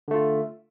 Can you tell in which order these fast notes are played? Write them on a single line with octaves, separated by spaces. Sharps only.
D3 A3 F4